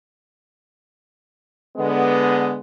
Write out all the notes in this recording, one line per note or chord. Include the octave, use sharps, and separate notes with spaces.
D3 G#3 B3